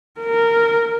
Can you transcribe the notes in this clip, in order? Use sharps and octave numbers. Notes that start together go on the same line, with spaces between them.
A#4